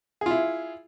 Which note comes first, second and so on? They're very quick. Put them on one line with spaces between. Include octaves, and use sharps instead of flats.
G#4 F4 E4